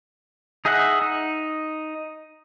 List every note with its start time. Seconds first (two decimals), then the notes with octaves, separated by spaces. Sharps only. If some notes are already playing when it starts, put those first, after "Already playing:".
0.65 D#4 G#4 D#5 E5 F#5
1.02 D#4